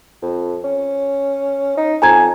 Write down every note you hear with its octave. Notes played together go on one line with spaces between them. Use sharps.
F2
C#4
D#4
F2 G#5 A#5 G#6